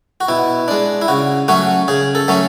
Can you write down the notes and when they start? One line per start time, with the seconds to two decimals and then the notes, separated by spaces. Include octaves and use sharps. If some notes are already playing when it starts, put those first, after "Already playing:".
0.20 F#4
0.28 B2 E4
0.68 G#3 D4
1.02 E4
1.08 C#3 F#4
1.48 F#3 A3 C#4 F#4
1.88 C#3 G#4
2.15 A4
2.28 F#3 A3 C#4